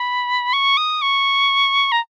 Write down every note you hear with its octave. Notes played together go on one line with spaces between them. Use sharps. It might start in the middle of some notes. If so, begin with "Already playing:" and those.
Already playing: B5
C#6
D#6
C#6
A#5